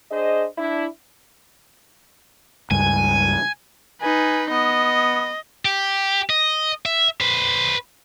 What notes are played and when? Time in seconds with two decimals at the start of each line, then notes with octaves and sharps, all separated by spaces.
0.10 D4 G#4 C5 D#5
0.57 D4 E4
2.71 C#2 G2 G#5
4.02 D#4 B4 G#5
4.50 B3 D#5
5.65 G4
6.30 D#5
6.86 E5
7.21 B4 C5